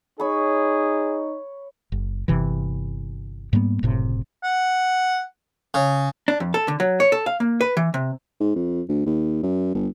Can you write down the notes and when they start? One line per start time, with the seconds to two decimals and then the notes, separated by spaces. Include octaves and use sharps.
0.20 D#4 G#4 C#5 B5
1.92 F#1
2.28 G1 C3 E3
3.53 G#2 G3 A#3 B3
3.83 F#1 A2 C3
4.44 F#5
5.74 C#3
6.28 D4
6.40 F2
6.54 A4
6.68 D3
6.80 F#3
7.00 C#5
7.12 A4
7.26 F5
7.40 A#3
7.61 B4
7.77 E3
7.94 C3
8.40 G#2
8.56 F2
8.89 D2
9.06 D#2
9.43 F#2
9.74 G1